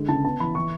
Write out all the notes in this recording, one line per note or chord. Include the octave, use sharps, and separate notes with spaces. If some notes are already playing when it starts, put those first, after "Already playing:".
Already playing: D3 G#3
C#3 A5
B3 A5
E3 B5
E3 C#6